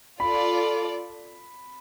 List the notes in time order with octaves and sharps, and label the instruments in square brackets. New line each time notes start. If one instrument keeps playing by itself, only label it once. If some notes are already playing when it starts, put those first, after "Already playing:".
[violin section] F4 A4 D5 [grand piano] B5